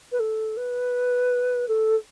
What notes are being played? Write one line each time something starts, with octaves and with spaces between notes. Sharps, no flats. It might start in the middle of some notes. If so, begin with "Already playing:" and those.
B4
A4
B4
A4